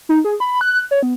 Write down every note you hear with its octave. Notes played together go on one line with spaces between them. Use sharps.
D#4
G#4
B5
F#6
C#5
B3